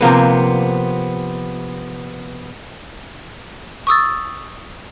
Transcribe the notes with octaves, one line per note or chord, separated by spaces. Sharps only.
C3 F3 A#3 B3
C#6 D#6 E6 A6